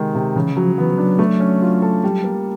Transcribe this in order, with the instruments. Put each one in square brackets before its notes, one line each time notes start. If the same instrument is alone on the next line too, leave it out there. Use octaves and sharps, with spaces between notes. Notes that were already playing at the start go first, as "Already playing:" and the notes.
Already playing: [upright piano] C3 D#3 G#3
C3
[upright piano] C#3 [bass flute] E3
[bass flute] F3 [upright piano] F#3
[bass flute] E3 [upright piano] B3
[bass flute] F3
[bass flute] F#3 [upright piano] D4
[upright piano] A3
C#4
F4
A4
G3
A#3